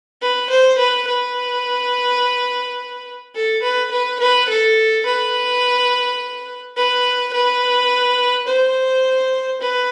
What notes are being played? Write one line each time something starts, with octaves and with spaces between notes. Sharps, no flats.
B4
C5
B4
B4
A4
B4
B4
B4
A4
B4
B4
B4
C5
B4